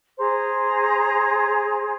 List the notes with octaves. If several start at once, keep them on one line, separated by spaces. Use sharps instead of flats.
G#4 C5 A#5